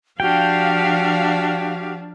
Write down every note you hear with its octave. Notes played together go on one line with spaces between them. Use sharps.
F3 D4 F#4 G4 F5 G5